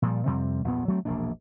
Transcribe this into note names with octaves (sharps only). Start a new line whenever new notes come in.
A#2 F3 G3
F2 C3 G3 C4
A#1 E2 G2 B3
F#3 A3 B3 C4
E1 A#1 A#3 D4